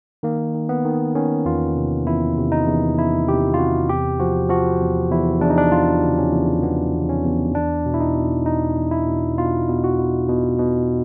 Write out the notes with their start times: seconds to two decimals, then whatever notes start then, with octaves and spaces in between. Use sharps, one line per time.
0.23 D#3 A#3
0.55 D#3
0.69 B3
0.85 D#3
1.15 D#3 C#4
1.45 E2 F4
1.76 C3
2.06 E2 E4
2.37 C3
2.52 D#4
2.67 E2
2.97 E2 E4
3.28 C3 G4
3.54 F4
3.59 C3 F#4
3.89 E2 G4
4.20 F3 F#4
4.50 F3 F#4
4.80 E2
5.11 E2 E4
5.41 E2 D4
5.50 D#4
5.58 D4
5.72 E2 F4
6.02 C#3
6.18 C#4
6.33 E2
6.63 E2 B3
6.94 E2
7.09 C#4
7.25 E2
7.55 E2 D4
7.86 B2
7.94 E4
8.00 D#4
8.16 B2
8.46 E2 D#4
8.77 E2
8.91 E4
9.07 B2
9.38 B2 F4
9.69 B2
9.84 F#4
9.99 B2
10.29 B2
10.59 B2